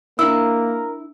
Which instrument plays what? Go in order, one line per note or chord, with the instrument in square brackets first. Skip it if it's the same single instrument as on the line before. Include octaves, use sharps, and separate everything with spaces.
[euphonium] A#3 [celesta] D4 E6 [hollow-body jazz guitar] E4 [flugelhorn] A#4